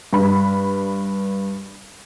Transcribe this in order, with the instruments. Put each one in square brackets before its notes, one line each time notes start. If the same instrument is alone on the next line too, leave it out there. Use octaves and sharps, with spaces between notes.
[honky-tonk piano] G2 B5